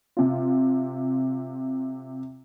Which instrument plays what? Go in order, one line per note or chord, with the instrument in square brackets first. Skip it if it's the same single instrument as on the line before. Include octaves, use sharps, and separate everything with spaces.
[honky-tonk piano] C3 F4